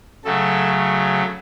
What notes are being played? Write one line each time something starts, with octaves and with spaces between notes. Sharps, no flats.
C#3 F#3 A3 A4